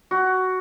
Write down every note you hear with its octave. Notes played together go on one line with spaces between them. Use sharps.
F#4